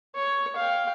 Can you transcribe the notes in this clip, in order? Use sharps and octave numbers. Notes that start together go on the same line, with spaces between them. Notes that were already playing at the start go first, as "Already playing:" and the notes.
C#5
F5 G5